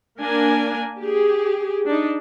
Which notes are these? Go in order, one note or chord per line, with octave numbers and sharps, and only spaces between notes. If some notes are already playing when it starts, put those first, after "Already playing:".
A#3 D4 A#4 G#5
G4 G#4
D4 D#4